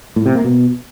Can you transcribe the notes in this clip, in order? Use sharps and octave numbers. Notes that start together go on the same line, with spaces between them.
A2
C3
A#3
B2